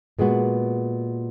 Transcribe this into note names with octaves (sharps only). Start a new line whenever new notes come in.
A#2 G#3 B3 F#4